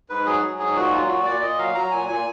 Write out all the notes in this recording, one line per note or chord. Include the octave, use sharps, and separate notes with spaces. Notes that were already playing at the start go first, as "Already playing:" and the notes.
G#2 B4
F#3 G#4
F#3
G#2 G#4
A#2 F#4
F#3 F4
A#2 F#4
A#2 D5
A#2 D#5
F#3 F5
F#3 A#5
A#2 G#5
A#2 G#5